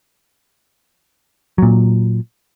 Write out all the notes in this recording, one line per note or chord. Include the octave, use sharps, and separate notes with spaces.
A#2 F#3